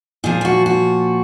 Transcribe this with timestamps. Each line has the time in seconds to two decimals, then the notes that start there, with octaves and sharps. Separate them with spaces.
0.24 A#2 F3 G#4
0.41 F4
0.45 F#4
0.66 F#4